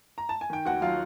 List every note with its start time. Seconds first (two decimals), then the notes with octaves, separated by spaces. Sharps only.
0.18 A#5
0.29 A5
0.41 G#5
0.50 D#3 G5
0.65 D#2 F#4 F#5
0.81 F#3 F4 F5